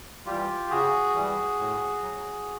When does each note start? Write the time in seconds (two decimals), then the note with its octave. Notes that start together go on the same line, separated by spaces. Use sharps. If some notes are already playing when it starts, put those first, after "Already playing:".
0.26 E3 G3 F4 G4
0.70 C#3 F#4 G#4
1.15 E3 G3
1.58 A2
2.02 F#3